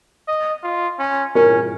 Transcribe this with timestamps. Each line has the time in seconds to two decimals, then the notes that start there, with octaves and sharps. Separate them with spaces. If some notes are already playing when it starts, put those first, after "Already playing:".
0.28 D#5
0.63 F4
0.99 C#4
1.35 C#4 A#4